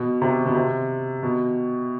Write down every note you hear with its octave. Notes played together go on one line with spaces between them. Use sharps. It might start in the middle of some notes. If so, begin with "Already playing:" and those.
Already playing: B2
C3
B2
C3
B2